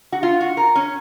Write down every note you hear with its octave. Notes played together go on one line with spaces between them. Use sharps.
F#4
F4
F#4
A#4
C#4